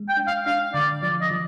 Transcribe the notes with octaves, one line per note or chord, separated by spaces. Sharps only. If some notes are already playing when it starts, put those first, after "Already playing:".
Already playing: G#3
G5
D4
F5
D4 F5
D3 D5
F3 D5
D#5
F3